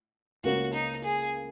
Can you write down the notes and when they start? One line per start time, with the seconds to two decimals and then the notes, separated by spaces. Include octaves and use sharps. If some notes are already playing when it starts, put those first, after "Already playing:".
0.43 C#2 C#3 A#3 C#4 F#4 A#4
0.73 D#4
1.04 G#4